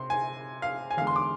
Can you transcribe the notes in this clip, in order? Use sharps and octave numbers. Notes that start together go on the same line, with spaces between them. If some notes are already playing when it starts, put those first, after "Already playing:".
Already playing: C3 C6
G#5
F5
G#5
E2 D3 G#3 F5
C6
D6